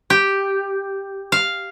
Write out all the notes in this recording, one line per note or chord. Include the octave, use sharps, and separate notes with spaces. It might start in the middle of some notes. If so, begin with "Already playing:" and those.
G4
F5